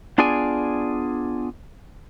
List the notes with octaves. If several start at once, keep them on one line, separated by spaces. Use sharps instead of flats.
B3 D4 F4 G#4 D5 G#5